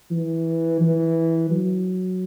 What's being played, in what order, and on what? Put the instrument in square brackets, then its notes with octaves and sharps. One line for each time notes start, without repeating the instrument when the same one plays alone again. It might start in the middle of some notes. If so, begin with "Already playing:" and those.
[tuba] E3
E3
F#3